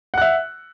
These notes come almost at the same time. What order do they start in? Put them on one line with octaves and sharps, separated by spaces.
F#5 F#6 E5